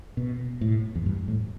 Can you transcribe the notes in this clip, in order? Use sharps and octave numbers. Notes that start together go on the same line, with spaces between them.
B2
A2
E2
G2
A2